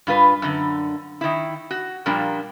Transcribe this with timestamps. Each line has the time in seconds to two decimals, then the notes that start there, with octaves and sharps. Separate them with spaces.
0.07 G2 F4 B4
0.42 F#2 D3
1.21 D#3 E4
1.71 F#4
2.06 A#2 F3 G3 A#3 D4